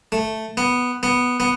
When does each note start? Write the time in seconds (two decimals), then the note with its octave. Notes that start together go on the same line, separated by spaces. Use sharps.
0.12 A3
0.57 B3
1.03 B3
1.40 B3